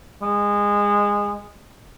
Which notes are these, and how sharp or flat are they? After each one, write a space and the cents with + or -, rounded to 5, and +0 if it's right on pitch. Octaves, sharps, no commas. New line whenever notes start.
G#3 -20